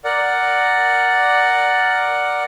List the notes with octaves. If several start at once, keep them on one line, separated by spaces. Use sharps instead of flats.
A#4 D5 F#5